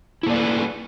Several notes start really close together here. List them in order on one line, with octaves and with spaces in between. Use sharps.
E4 A#3 D5 A3 B4